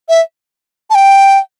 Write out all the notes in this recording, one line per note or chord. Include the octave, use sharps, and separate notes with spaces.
E5
A5
G5